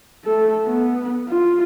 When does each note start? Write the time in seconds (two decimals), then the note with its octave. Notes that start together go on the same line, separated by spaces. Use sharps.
0.25 A3 A4
0.65 B3
1.28 F4